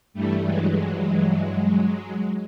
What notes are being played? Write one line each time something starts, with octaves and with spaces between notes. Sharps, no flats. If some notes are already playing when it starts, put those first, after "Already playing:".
G2 E3 G3 A3
F#3 G#3